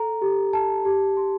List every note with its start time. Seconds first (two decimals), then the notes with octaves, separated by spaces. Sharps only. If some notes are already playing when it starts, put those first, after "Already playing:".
Already playing: A4 A#5
0.22 G4
0.53 A5
0.85 G4
1.17 C6